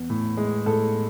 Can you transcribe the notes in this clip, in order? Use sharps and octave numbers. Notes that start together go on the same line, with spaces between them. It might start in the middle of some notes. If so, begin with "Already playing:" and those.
Already playing: E2
A2
G#3
A2 A4